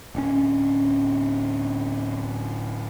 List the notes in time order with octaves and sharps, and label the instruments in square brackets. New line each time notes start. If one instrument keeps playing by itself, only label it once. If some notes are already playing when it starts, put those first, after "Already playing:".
[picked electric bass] D1 C#4